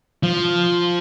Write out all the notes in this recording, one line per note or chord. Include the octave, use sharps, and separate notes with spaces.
F3